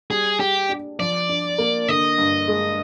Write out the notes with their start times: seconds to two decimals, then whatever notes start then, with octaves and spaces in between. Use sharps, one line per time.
0.10 G3 G#4
0.40 G4 G#4
0.69 D4
0.99 F3 D5
1.29 D4
1.58 A#3
1.89 D3 D#5
2.18 G2
2.48 G#3